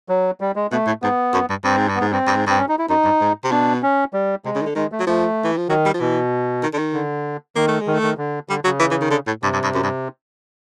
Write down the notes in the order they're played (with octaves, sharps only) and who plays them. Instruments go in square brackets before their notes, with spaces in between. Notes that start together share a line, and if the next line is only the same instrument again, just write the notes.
[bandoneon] F#3
G3
G#3
[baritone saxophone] B2 [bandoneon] A3
[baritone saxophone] A2
[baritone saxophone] G#2 [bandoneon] B3
[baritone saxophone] F#2
G2
[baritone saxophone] G2 [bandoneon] C4
[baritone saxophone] G#2
G2
[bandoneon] B3
[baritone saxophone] G#2
[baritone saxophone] G2 [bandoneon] C4
[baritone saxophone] G2
G#2
[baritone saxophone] G2 [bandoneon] C4
[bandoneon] C#4
D#4
E4
[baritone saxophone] F#2 [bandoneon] D#4
[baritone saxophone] G2
G#2
C3
[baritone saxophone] B2 [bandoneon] D4
[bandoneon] C#4
G3
[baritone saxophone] C3 [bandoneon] G#3
[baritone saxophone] C#3
D#3
D3
[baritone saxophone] D#3 [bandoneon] G#3
[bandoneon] A3
[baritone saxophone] F#3
[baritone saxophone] F3 [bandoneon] A3
[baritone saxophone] E3
F3
[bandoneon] D#3 [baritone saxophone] F#3
[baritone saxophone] G3
F3
[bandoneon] B2 [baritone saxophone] E3
[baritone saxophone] D#3
D3
D#3
[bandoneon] D3
[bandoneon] D#3 [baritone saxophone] A#3
[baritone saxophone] A3
G#3
[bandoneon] D#3
[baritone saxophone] A3
[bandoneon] D#3
D3
[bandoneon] D3 [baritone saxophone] G3
[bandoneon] C#3 [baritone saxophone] F#3
[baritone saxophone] E3
E3
D#3
D3
A2
[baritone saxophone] G2 [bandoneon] C3
[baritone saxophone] G2
G2
F#2
G2